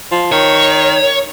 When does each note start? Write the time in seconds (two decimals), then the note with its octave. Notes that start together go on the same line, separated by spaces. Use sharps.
0.12 F3
0.32 D#3 C#5